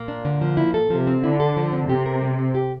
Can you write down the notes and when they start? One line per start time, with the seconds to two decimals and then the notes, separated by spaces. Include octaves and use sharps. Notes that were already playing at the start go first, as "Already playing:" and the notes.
Already playing: A#2 A#3
0.08 D4
0.25 D3
0.41 F3
0.57 E4
0.74 A4
0.90 C3 F3
1.07 C4
1.24 D3 E4
1.40 A4
1.57 F3
1.72 C4
1.89 C3 G4
2.06 A#4
2.22 G3
2.39 C4
2.55 G4